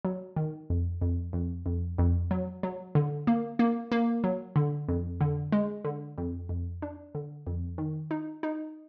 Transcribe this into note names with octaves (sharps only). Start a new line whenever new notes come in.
F#3
D#3
F2
F2
F2
F2
F2
F#3
F#3
D3
A#3
A#3
A#3
F#3
D3
F2
D3
G#3
D3
F2
F2
D4
D3
F2
D#3
D#4
D#4